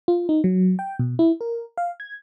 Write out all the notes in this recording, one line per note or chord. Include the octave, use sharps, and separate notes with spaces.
F4
D#4
F#3
G5
B2
E4
A#4
F5
G#6